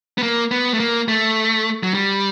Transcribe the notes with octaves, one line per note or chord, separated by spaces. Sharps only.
B3
A#3
B3
A3
A#3
A3
F#3
G3